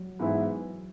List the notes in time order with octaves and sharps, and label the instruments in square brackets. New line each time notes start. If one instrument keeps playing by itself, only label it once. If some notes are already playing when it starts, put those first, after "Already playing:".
Already playing: [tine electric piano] F#3
[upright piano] G#2 E3 B3 E4